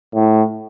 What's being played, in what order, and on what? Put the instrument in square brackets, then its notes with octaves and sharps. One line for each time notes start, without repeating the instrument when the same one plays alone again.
[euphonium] A2